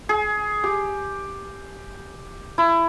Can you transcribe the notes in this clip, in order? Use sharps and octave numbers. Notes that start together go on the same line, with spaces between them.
G#4
G4
E4